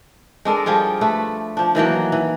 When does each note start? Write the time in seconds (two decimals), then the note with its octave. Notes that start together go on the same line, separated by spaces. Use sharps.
0.45 G#3 D4 A4 A#4
0.66 F3 G3 F4 G#4
1.01 A3 A4 B4
1.57 F3 D4
1.75 D#3 E3 F#3 A#3
2.12 E3